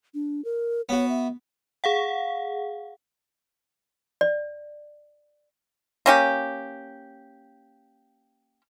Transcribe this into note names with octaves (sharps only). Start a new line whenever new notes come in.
D4
A#4
B3 F#4 C#5
E5
G#4 F5 F#5
D5
A#3 C#4 G4